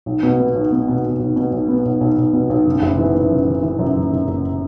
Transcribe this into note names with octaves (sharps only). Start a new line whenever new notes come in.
B1
B2
B3
B1
B3
B2
B2
B1
B2
B1
B3
B1
B1
B1
B2
B1
F#1
F#1
E3
E3
F#2
E3
E3
F#2
F#1
F#1
F#1